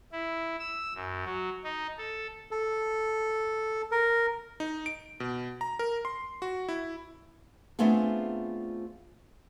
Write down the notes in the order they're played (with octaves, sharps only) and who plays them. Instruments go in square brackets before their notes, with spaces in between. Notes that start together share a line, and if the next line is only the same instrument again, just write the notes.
[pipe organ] E4
E6
F#2
F#3
D#4
A4
[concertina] A4
A#4
[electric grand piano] D#4
D7
B2
A#5
A#4
C6
F#4
E4
[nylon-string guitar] A3 B3 C4 D4 F4 G#4